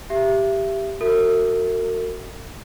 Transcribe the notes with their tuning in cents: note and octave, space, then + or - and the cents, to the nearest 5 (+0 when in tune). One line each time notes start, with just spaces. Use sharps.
G4 +0 E5 +25
F#4 +0 A#4 -45 E5 +0